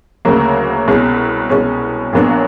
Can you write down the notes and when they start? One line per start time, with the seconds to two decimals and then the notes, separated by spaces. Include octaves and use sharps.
0.25 D2 C#3 F#3 A#3
0.88 C2 B2 G#3 C#4
1.50 C2 B2 G#3 C#4
2.13 A#1 A#2 F#3 B3 D4